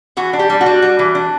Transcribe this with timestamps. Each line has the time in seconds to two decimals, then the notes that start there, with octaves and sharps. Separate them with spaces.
0.17 E3 F#4
0.33 D4
0.39 G4
0.50 G3
0.61 F#4
0.66 G3
0.82 G3
0.99 E3
1.15 D4